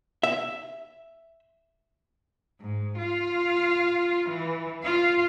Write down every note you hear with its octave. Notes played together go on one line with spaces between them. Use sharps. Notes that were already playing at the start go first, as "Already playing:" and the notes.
E5
G#2
F4 F5
E3
F4 F5